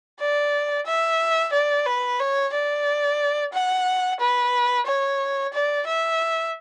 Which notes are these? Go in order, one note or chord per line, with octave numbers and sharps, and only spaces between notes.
D5
E5
D5
B4
C#5
D5
F#5
B4
C#5
D5
E5